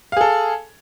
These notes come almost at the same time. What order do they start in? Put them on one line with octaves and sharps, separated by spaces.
F5 G#4 A4